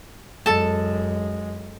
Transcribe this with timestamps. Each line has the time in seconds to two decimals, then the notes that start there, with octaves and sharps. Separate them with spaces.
0.46 F#2 G#3 A4 A5